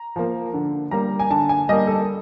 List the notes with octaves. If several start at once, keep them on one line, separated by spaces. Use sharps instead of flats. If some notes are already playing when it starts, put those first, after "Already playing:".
Already playing: A#5
F3 A#3
D3
G3 A#3 A#5
G#5
D3 A5
G#5
G3 A#3 D#5
A4